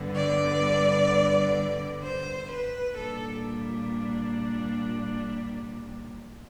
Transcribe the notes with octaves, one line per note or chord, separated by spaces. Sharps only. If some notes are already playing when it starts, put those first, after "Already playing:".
Already playing: G2 D3 G3 B3
D5
C5
B4
A#2 G3 D4 A4